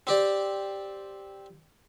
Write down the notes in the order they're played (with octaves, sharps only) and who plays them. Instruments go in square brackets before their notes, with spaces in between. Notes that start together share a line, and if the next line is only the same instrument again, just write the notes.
[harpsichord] C4 G4 D5